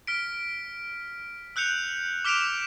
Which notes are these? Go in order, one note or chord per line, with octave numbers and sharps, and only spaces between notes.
F6 B6 D7
E6 F#6 G6 C#7 F7
D6 F6 B6 D7 E7 F7